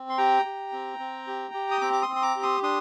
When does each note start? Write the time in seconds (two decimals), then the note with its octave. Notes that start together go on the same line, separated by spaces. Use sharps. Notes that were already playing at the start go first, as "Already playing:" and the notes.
Already playing: C4
0.09 C6
0.18 G4 G5 A#5
0.45 G4
0.73 C4
0.99 C4
1.27 G4
1.54 G4
1.71 D#6
1.81 C4 A#5 D6
1.93 D6
2.02 C6 D#6
2.08 C4
2.16 C6
2.22 A#5 D6
2.36 G4
2.43 C6 D#6
2.63 D4 C6 D#6